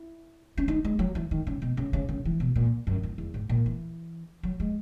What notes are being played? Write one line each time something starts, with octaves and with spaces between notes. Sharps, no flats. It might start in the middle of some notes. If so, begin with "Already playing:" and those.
Already playing: E4
C#4
D#4
G#3
F#3
E3
D#3
C#3
B2
C#3
C#3
C#3
E3
B2
A#2
F#2
E2
E2
G#2
A#2
E3
F#3
G#3